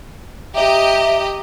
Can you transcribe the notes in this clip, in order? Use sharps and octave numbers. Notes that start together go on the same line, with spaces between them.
G4 D#5 E5 A#5